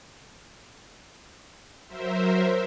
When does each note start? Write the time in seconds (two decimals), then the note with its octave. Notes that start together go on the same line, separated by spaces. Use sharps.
1.87 F#3 A#4 C5 E5